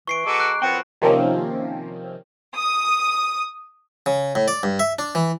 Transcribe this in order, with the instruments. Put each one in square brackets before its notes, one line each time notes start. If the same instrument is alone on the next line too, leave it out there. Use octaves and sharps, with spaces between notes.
[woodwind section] E3 [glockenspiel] C#6 C7 D7
[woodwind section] G#3 A#5 D6 [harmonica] F#4 A4 B4
[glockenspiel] F#6
[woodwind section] F#2 F3 C4 [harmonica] B3 F#4 [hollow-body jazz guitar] G5
[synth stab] C3 D#3 F3 A#3 C4 C#4
[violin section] D#6
[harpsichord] C#3
A2
D5
G2
E5
D4
E3